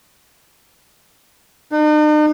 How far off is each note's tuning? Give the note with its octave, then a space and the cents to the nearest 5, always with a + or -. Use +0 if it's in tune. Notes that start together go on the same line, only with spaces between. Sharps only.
D#4 -45